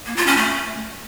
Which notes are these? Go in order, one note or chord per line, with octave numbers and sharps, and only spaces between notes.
A#3
F4
C#4
A3